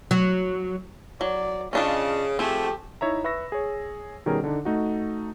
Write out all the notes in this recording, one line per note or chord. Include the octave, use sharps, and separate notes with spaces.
F#3
F#3 D5
C#3 C#4 D4 F4 D#5 A5
F3 A3 C4 G4 G#4
D#4 E4 C#5 E5 A#5
B4 E5 B5 C#6 E6 A#6
G#4 C#5
B2 D#3 G3 C#4 G#4 A#4
D3 D4 D#4
A3 D#4 F#4